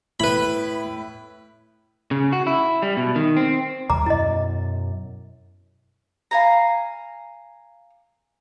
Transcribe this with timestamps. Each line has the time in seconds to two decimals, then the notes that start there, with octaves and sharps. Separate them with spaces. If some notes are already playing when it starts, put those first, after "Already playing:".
0.20 A2 E4 B4 B5
2.11 C#3
2.33 F#4
2.47 E4
2.82 G3
2.97 B2
3.16 D#3
3.37 C4
3.90 D#2 C3 G3 A#5 D6
4.06 F#2 B2 E4 D#5
6.31 F5 G#5 A#5